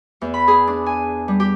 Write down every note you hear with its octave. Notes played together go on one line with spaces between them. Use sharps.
E2
B5
G#4
D4
G#5
G3
G4